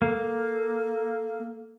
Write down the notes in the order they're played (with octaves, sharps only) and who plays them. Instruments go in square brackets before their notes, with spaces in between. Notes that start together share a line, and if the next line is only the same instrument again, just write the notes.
[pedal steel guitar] A#3 [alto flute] A4